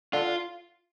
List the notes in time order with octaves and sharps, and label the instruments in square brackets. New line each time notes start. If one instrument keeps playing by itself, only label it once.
[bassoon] D3 [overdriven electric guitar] F4